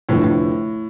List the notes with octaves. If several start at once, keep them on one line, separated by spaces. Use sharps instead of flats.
F1 F2 A2 D3 F3 B3
A2